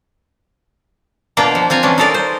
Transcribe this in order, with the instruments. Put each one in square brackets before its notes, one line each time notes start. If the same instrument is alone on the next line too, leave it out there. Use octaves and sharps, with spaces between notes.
[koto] B2 A#3 D4 F4 G5 A#5
F3
C4 F4 G#5 A#5
E3 C#4 D4
D#4 F4 A4 A#4 D5
C5